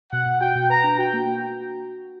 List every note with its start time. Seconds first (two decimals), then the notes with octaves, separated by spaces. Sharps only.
0.12 B2 F#5
0.26 B2
0.41 F#4 G5
0.55 B2
0.70 B4 A#5
0.84 D4
0.98 F#4 G5
1.13 A#3
1.28 F#4